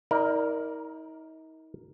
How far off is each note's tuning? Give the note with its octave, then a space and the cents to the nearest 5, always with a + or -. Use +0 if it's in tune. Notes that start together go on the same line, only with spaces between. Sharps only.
D#4 +40 A#4 +0 D5 +0